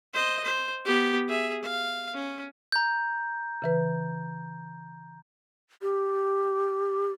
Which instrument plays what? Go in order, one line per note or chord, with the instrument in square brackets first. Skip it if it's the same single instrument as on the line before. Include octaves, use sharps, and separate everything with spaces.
[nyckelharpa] C5 D#5
C5
B3 G4
G#4 E5
F5
C#4
[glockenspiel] A#5 G6
[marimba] C#3 E3 B4
[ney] G4